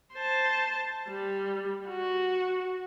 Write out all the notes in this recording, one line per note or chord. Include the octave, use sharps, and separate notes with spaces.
C5 A5
G3
F#4